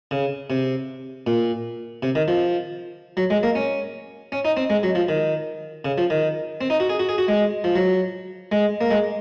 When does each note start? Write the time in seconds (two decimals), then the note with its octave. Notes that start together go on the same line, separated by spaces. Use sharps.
0.11 C#3
0.50 C3
1.27 A#2
2.03 C3
2.15 D#3
2.28 F3
3.17 F#3
3.30 G#3
3.43 A#3
3.55 C#4
4.32 C#4
4.45 D#4
4.57 C4
4.70 G#3
4.83 F#3
4.95 F3
5.09 D#3
5.85 C#3
5.98 F3
6.10 D#3
6.61 C4
6.70 D#4
6.80 F#4
6.90 G#4
6.99 F#4
7.09 G#4
7.18 F#4
7.28 G#3
7.64 F3
7.76 F#3
8.52 G#3
8.81 A#3
8.91 G#3